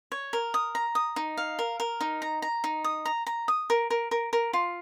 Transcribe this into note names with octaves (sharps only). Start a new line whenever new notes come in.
C#5
A#4
D#6
A#5
D#6
D#4
F5
A#4
A#4
D#4
A#5
A#5
D#4
D#6
A#5
A#5
D#6
A#4
A#4
A#4
A#4
F4